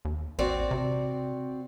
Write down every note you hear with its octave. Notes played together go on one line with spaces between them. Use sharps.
D#2
A1 C4 F#4 D5
C3